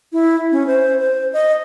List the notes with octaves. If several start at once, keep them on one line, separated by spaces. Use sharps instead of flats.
E4
C#4
C5
C5
D#5